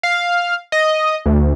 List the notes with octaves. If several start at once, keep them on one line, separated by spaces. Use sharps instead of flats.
F5
D#5
D2